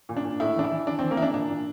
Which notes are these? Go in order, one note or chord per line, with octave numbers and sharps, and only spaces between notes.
A#2
D4
A#2
A2 E4
E3 D4
E4
E3
E3 D4
E3 C4
A#3
E3 D4 E4
A#2 D4
A#2